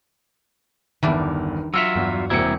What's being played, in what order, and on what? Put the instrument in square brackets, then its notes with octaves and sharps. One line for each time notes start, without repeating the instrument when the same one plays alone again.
[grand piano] G1 E2 [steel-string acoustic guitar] D#3 [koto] E3 G3 D4
[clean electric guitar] F#3 F4 E5 [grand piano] E6 C#7 F7
[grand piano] E2 [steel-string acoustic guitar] G2 F#4
[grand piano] E1 C4 C#7 [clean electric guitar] C2 A#3 E4